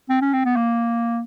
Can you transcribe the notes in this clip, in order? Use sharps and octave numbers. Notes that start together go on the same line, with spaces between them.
C4
C#4
C4
B3
A#3